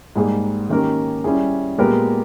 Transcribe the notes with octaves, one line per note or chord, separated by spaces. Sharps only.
G#2 G3 A#3 D#4 G#4
D#3 A#3 C#4 G4 A#4
G3 C#4 E4 G#4
A#2 G#3 B3 G4 A#4